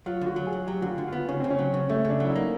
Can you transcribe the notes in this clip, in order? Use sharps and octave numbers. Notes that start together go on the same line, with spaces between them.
F#3 F4
D3 F#4
F#3
G#4
F#3
F#3 G4
D3 F#4
F4
D3
B3 F4
C#3 C#4
C#3 C4
C#4
F#3
C#3
C#3 A3
C#3
D4
F#3
E4
D#4
A#3